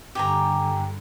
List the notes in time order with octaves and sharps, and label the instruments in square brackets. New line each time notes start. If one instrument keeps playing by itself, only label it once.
[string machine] G2 D3 [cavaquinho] G4 G#5 A#5